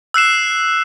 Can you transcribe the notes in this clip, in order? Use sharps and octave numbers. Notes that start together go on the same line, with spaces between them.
E6 F#6 C7 E7